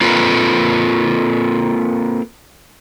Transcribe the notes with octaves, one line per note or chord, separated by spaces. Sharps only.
A#3 C4 F4 A4 B4